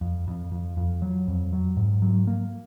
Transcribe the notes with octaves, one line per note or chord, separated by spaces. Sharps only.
F2
F2
F2
F2
F#3
F2
F#3
G#2
F#3
A#3